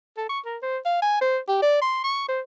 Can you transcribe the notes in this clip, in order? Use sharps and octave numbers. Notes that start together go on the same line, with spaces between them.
A4
C#6
A#4
C5
F5
G#5
C5
G4
D5
C6
C#6
C5